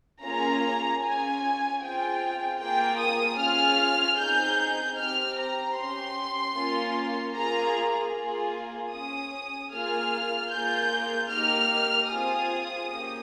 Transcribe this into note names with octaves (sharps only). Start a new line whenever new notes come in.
A#3 C#4 F4 G#4 A#5
C#4 F4 G#4 G#5
C4 F4 G#4 G5
A#3 F4 G#4 G5
D#6
C#4 F4 G#4 F6
C4 D#4 G#4 G6
C4 G4 F6
A#5
C#4 G4 C6
A#3 C#4 F4
A#3 F4 G#4 A#5
A#3 F4 G#4
C#4 G#4 D#6
A#3 F4 G#4 F6
A#3 F4 G#4 G6
A#3 D#4 G4 F6
C4 F4 G#4 D#6
A#3 C#4 G4